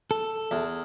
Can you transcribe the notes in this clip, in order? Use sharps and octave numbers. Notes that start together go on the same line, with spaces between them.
A4
E2